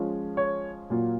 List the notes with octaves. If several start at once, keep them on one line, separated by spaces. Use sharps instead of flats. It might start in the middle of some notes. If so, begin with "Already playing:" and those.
Already playing: F3 G#3 C#4 F4
C#5
A#2 F#3 A#3 F4